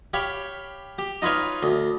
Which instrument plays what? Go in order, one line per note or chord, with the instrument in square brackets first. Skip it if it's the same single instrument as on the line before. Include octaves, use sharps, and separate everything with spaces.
[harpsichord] G4 C#5 F5 G5 B5
G4
D#4 F4 B4 C#5 F5
D2